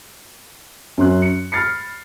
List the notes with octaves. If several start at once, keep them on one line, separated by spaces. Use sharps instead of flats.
F#2 C#4 C6 F#6
C#7
B5 F6 A6 C7 C#7